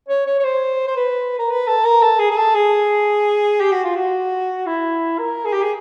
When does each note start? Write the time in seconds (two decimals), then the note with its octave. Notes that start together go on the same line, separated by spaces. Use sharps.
0.08 C#5
0.26 C#5
0.39 C#5
0.44 C5
0.87 C5
0.96 B4
1.39 A#4
1.50 B4
1.67 A4
1.84 A#4
2.02 A4
2.19 G#4
2.30 G#4
2.37 A4
2.54 G#4
3.60 G4
3.72 F#4
3.84 F4
3.95 F#4
4.66 E4
5.18 A#4
5.45 G#4
5.53 G4
5.62 G#4